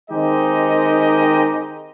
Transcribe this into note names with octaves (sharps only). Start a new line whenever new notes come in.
D#3 G#3 C4 D#4 G4 D#5